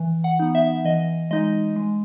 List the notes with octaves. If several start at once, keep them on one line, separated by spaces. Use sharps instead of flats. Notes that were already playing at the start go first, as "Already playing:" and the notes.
Already playing: E3
F#5
B3 D#4
E5
E3 D#5
G#3 D#4 D#5
G#3